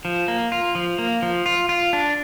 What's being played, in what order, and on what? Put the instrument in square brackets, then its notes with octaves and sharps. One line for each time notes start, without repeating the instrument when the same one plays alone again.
[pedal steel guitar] F3
A#3
F4
F3
A#3
F3
F4
F4
D4